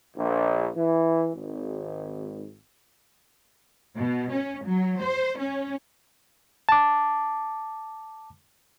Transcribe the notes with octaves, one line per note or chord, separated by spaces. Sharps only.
A#1
E3
G#1
B2
C#4
F#3
C5
C#4
A5 D6